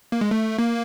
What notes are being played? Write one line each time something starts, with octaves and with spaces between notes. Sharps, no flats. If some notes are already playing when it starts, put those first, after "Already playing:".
A#3
G#3
A3
A#3